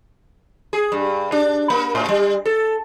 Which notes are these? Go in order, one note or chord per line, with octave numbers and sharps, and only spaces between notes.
G#4
G2
D4
A#3
A2
G3
A4